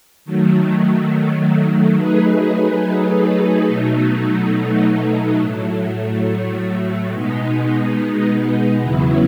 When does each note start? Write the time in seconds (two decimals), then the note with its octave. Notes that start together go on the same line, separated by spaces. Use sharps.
0.25 D#3 F#3 A3
1.96 F#3 A3 D#4 G#4 B4
3.67 B2 F#3 A3 D#4
5.38 A2 F#3 A3
7.10 B2 G#3 B3 D#4
8.81 E2 C#3 F#3 B3 E4